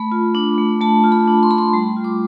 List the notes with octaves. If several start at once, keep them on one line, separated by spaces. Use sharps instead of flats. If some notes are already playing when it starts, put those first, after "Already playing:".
Already playing: A3 B5
F4
D4
A3
A3 A5
F4
B5
D4
C6
A3 B5
C6
G3
F4
D6